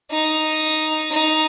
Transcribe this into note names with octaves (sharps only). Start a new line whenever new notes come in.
D#4
D#4